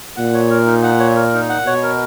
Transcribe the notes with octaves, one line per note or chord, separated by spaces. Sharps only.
A#2 F#5
C#5
A#4
D#4
F#5
C#5
A#4
D#4
F#5
B2 C#5
A#4